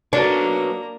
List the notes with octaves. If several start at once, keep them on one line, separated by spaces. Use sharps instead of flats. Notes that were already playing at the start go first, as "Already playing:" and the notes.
A#3 D4 F#4 B4 C#5 A#5